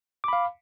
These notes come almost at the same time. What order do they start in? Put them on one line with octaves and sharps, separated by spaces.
D6 B5 F5